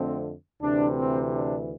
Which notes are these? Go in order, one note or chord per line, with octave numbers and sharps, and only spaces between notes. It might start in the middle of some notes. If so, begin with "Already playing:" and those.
Already playing: F2 D3 A3 C4
D2 C3 E3 D4
C4
D4